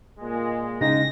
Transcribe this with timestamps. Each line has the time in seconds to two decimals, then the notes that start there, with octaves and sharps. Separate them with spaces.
0.19 A#2 G#3
0.81 C#3 G#3 D#4 G5 G#5 A#6